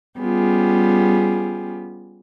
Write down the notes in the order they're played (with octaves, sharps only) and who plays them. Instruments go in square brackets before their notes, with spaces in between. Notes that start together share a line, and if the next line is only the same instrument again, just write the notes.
[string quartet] G3 B3 C#4 F4 G4 G#4